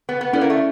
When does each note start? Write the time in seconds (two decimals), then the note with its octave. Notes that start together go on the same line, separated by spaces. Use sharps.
0.09 B3
0.21 B3
0.33 B3 C#4 E4 A4 D5
0.41 A#3
0.50 A3